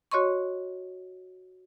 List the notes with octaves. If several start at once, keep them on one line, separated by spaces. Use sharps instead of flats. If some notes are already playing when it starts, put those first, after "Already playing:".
F#4 C#5 D#5 C6 C#6